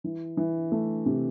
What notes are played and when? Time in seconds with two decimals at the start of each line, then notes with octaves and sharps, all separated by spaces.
0.04 E3
0.37 E3
0.72 A3
1.06 C3